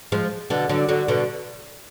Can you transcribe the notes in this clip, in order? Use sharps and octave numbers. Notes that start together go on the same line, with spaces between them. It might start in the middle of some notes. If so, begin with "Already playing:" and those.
F3 G#3
B2 D3
D3 F#3
D3 F#3
B2 D3